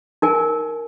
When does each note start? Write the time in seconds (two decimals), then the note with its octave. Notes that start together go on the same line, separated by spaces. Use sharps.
0.22 D#4 A#4 G#5